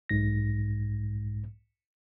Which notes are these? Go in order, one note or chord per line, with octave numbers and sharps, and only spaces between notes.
B1 G#2 A#6